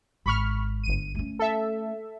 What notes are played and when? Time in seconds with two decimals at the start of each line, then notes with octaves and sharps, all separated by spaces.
0.26 G#1 B5 C#6 F6
0.83 G1 D#7
1.15 A3 C#4
1.39 A4 E5